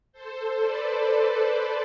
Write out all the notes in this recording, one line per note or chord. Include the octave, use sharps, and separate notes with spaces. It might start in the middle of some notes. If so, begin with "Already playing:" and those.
A4 C5
B4 D5
A4 C5
A4 C5